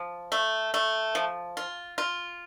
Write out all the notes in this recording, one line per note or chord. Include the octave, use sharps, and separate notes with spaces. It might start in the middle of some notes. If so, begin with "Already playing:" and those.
Already playing: F3
A3
A3
F3
F4
F4